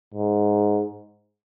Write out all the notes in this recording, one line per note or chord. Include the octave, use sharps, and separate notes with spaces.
G#2